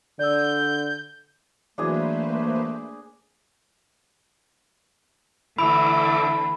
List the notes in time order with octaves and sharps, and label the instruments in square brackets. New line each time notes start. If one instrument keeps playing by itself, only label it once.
[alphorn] D3 [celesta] D5 E6 [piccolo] G6
[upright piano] E3 F#3 [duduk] A3 [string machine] A#3 B4 C5 [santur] D4 G#4
[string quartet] D3 E3 A3 [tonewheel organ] E4 E5 D6 [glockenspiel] B5